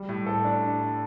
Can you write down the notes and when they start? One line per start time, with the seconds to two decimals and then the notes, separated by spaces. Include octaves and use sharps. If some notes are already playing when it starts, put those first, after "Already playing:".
Already playing: G3
0.09 A2
0.26 A4
0.45 D4